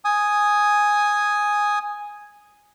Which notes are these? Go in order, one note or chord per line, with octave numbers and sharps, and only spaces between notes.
G#5 D#6